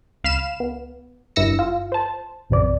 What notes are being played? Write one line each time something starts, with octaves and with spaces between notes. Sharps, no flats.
C#2 F5 B5 F6 E7
B3
G1 G2 E4 E6 A#6 C#7
F4
C5 A5
A#1 F#2 C3 D5